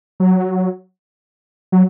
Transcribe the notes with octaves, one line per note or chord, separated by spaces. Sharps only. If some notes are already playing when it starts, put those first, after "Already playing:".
F#3
F#3